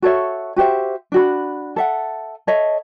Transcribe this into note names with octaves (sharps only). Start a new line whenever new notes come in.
F#4 A4 C#5 E5
F#4 G4 C5 E5
D4 F#4 B5
A4 E5 F#5
A4 C#5 D#5 E5